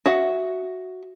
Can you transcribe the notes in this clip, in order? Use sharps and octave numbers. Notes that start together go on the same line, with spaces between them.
F#4 E5 F#5